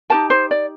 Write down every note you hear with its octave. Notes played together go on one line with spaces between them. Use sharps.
D#4 G4 A#4 A5
C5
D5